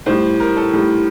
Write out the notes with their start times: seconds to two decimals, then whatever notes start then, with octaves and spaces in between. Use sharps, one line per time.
0.06 A2 G3 C5
0.40 A#4
0.56 A4
0.73 A2 G3